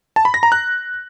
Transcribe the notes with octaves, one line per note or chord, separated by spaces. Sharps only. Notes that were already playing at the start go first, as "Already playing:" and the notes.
A5
B5
A#6
A#5
F#6